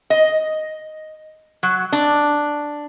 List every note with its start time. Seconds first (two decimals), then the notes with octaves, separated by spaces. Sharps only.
0.10 D#5
1.63 F#3
1.92 D4